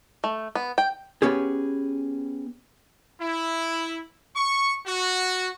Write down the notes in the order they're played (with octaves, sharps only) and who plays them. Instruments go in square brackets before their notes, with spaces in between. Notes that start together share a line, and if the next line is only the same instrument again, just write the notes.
[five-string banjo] A3
B3
G5
[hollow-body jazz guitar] B3 C#4 G4 G#4
[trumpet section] E4
C#6
F#4